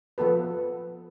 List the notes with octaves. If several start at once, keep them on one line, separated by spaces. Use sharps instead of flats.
F3 B3 A4 B4